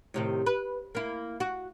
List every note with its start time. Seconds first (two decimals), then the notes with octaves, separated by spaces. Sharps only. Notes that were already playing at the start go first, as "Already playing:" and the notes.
0.14 A2 C3 D#3
0.46 B4
0.95 A#3 E4
1.40 F#4